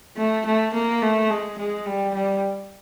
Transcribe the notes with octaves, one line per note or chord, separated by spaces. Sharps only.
A3
A3
A#3
A3
G#3
G#3
G3
G3